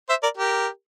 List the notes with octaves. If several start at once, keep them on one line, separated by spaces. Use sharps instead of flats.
C5 E5
A#4 D5
G4 A#4